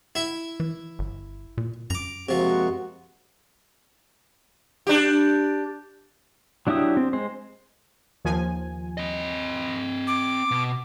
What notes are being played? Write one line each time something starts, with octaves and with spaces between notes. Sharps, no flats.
E4 E5
E3
G1
A#2
F#2 A#5 D6
C3 F3 G#3 A#3 F#4
D4 G4
F#3 D4 E4 G4 D#6
C4
G#3 C5
D#2 F3 G#5
C4 D#5
D6
B2